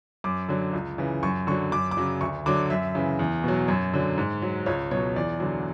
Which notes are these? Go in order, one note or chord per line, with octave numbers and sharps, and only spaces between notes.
F#2 D6
D3 F#3
C#2
C#3 E3
F#2 C#6
D3 F#3 C#6
F#2 D6
D6
C#3 F#3
D2 C#6
D3 F#3 D6
F#2 E5
C#3 E3
E2
B2 F#3
F#2 C#5
D3 F#3
G#2
F#3
C#2 C#5
B2 F#3 C#5
E2 D5
D3 F#3